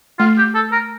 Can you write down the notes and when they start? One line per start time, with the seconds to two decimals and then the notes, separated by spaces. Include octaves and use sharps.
0.19 A3 F4
0.38 G4
0.55 A4
0.72 A#4